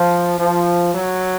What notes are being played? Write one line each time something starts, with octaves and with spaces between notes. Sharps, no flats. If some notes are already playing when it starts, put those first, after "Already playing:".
Already playing: F3
F3
F#3